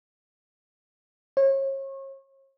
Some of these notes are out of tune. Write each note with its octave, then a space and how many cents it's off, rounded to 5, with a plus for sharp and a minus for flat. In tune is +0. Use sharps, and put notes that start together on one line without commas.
C#5 -35